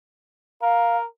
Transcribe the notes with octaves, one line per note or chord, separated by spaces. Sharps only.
A#4 F5